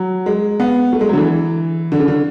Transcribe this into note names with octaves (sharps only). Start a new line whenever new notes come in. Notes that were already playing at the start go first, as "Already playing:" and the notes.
Already playing: F#3
G#3
B3
A3
G#3
F#3
D3
E3
D3
C#3
D3